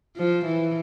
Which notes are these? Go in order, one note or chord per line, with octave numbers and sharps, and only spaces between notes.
F3
E3